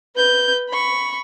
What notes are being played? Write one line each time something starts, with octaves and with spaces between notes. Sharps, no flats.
B4 G6
B5 C#6